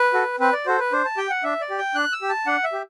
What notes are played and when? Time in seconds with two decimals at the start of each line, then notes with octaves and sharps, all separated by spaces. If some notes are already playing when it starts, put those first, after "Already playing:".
Already playing: B4
0.13 F#4 A4
0.40 C4 B4
0.53 D5
0.66 F#4 A4 C5
0.79 B4
0.92 D4 C5
1.05 A5
1.17 G4 G5
1.30 F#5
1.43 D4 E5
1.61 D5
1.70 G4
1.78 G5
1.95 D4 F#6
2.12 E6
2.22 G4
2.29 A5
2.47 D4 F#5
2.64 E5
2.73 G4